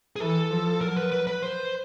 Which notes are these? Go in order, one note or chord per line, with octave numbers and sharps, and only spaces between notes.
G#4
E3 A4
F3
F#3 A#4
B4
B4
B4
C5